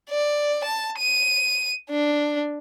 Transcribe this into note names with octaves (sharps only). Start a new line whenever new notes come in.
D5
A5
D#7
D4